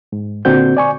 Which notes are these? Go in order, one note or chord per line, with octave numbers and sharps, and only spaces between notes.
G#2
A#2 D3 C4 D4 F#4 G6
D5 G#5 C#6